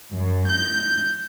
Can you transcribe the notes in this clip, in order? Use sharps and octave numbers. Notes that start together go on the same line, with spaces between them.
F#2
G6